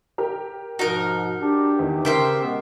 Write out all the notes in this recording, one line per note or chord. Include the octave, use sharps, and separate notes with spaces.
G4 A#4
G#2 B2 F3 D#4 F#4 A#4
D4 G4
E2 D#3
C#3 A#4 C5 E5 G5
B2 G#3 B3